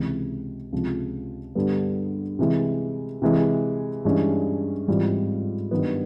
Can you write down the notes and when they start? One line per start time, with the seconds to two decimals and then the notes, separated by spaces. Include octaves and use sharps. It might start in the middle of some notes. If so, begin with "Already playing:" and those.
Already playing: C#2 C3 E3
0.72 C#2 C3 F3
1.55 G2 D3 G3 B3
2.39 C3 E3 G#3
3.22 C3 E3 G#3
4.05 G2 E3 G#3 C#4
4.88 G#2 E3 G3 C4 F4
5.71 G2 D#3 F#3 B3